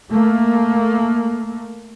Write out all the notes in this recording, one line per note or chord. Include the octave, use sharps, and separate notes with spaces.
A3 A#3